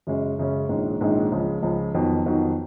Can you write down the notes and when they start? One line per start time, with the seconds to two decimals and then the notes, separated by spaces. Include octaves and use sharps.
0.07 F#2 C#3 G#3 C#4
0.38 F#2 C#3 G#3 C#4
0.69 A#1 G#2 D#3 G#3 C#4
1.00 A#1 G#2 D#3 G#3 C#4
1.32 C#2 C#3 F3
1.62 C#2 C#3 F3
1.94 F2 D#3 F#3 B3 D#4
2.26 F2 D#3 F#3 B3 D#4